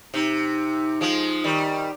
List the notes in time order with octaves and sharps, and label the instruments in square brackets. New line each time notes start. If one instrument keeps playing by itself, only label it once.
[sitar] C3 [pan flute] D#4
[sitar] F3 G#3
D#3 G3